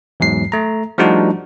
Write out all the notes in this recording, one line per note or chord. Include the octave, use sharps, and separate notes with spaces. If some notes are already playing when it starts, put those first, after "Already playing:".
E2 G#2 F#3 C7
A3 A#5
F3 G3 A3 D4 D#4 F#4